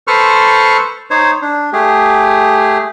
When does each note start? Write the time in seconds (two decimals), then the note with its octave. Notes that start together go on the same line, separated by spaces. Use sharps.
0.07 A4 B4 C5 C#6 F6
1.10 D#4 C5 C#5
1.42 D4
1.73 A3 G4 G#4